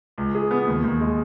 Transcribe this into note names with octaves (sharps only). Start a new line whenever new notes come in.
C#2
G#4
B3
D#2
D#2
G#3